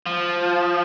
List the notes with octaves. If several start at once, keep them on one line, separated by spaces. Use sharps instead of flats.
F3